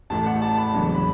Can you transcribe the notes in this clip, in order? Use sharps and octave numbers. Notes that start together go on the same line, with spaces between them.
A1 A2 A3 A5
F#5
A5
B5
F#1 E2 D3 F#3
B5